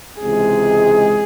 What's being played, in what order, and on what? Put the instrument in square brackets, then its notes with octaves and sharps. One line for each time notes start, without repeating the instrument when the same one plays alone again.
[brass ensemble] C#2 C3 E3 G#3 [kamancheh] G#4